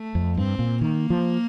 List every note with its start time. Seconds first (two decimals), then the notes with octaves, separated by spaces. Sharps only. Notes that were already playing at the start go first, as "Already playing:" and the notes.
Already playing: A3
0.15 F2
0.37 G2 C4
0.59 A#2
0.81 D#3 A#3
1.10 F3